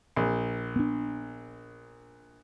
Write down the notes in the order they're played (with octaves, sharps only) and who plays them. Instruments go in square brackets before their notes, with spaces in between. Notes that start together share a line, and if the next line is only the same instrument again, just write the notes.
[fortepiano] A#1
[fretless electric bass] B3 D4